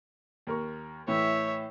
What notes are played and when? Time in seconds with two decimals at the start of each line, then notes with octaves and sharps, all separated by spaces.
0.47 D#2 A#4 C#6
1.08 A2 E3 C#5 E5